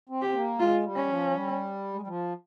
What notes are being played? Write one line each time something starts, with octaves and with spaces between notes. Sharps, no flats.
C4
G4
C4
A#3
G#3 F4
G3
C#4
F3
G3
G#3
G3
F3